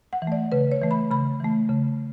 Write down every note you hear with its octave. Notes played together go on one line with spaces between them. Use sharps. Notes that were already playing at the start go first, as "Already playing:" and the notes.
F#5
E3
A3 D5
C#3 B4
C#5
E3 A3
B5
C#3 B5
E3 A3
C#3